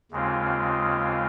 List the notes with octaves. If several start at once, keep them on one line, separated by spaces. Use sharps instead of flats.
D#2 C#3 G#3 C4 F4